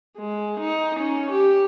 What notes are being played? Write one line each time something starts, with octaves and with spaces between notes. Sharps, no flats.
G#3
D#4
C#4
G4